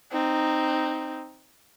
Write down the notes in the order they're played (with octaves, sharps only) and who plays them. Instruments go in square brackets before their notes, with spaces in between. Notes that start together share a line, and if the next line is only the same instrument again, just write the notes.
[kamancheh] C4 D#4